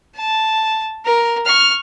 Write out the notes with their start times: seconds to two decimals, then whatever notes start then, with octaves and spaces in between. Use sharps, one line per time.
0.16 A5
1.05 A#4
1.46 C#6 F6